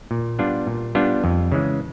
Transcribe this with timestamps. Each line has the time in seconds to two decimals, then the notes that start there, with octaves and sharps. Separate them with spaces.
0.11 A#2
0.39 G3 B3 D4 F4
0.67 A#2
0.95 G3 B3 D4 F4
1.24 F2
1.52 C#3 E3 G#3